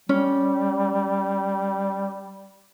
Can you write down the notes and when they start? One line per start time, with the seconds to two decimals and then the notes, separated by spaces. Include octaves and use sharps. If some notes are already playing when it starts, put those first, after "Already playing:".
0.09 G3 C#4